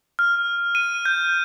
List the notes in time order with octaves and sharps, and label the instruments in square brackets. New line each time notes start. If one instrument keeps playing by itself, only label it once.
[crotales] F6
D#7
G6